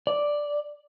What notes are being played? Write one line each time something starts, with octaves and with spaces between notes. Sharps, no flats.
D5